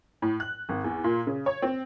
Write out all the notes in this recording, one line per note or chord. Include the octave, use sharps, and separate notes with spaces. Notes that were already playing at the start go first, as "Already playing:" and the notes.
A2
F#6
G#1
E2
A#2
C#3
C#5
C4